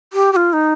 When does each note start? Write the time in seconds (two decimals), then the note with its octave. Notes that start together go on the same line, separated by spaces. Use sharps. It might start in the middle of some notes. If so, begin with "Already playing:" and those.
0.13 G4
0.33 G4
0.36 F4
0.53 D#4